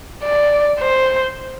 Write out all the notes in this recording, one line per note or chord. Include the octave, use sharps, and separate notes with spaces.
D5
C5